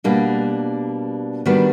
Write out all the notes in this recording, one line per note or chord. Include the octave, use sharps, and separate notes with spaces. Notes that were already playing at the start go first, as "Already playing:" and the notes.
B2 G3 A#3 D4
D#3 G3 B3 D4 F#4